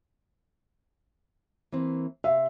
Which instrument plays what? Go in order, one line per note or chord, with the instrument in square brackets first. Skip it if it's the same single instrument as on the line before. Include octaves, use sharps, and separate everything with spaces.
[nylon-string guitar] E3 A#3 C4
[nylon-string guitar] C3 F5 [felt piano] E5